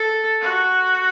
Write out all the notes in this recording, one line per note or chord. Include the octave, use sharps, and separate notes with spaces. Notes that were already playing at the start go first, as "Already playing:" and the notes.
Already playing: A4
F#4